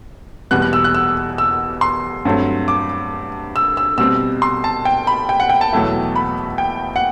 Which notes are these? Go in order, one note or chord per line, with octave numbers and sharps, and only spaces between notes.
E2 B2 G3 B3 F#6
F#6
E6
F#6
E6
E6
C6
G2 F#3 A3 C4
D6
E6
E6
B2 G3 C4 E6
C6
A5
G5
B5
G5
F#5
G5
A5
E2 B2 F#3 A3 E4
B5
G5
F#5